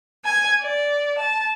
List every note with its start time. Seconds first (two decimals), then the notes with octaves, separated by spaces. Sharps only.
0.25 G#5
0.62 D5
1.18 A5